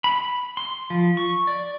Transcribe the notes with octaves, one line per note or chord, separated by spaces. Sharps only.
B5
C6
F3
C#6
D5